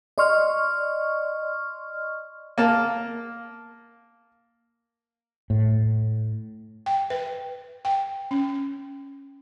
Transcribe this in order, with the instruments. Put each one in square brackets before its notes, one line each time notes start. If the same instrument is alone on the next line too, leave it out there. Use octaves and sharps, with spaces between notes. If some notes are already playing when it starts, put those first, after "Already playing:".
[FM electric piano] D5 D#5 C6 C#6 F6
[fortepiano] A#3 A5
[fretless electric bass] A2
[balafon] G5
B4
G5
C#4